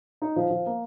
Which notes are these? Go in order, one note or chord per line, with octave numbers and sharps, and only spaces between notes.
D#4
F3
F3
A#3